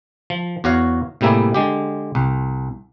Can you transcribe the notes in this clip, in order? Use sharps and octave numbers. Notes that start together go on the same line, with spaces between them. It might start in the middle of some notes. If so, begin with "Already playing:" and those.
F3
E2 F#4 C#5 F5
A2 C3 G3 A#3 E4 G#4
D3 G#3 G4
C2